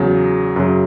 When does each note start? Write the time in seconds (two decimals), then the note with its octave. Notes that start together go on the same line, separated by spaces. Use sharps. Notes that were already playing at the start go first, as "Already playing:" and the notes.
Already playing: E2 C#3 F#3
0.56 F#2 C#3 F#3